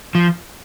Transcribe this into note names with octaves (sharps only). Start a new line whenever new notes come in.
F3